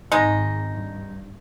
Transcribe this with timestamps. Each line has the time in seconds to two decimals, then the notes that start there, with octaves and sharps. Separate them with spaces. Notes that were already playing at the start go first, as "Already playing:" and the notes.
0.12 G#1 G#2 D#3 G#3 D#4
0.71 G2